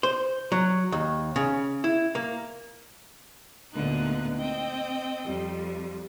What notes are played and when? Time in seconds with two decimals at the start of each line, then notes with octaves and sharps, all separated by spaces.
0.03 C5
0.52 F#3
0.92 D#2
1.36 C#3
1.84 E4
2.15 A#3
3.72 D2 A#2 D3 B3 D#4 F#6
4.37 C4 D#5 G5
5.25 F2 G3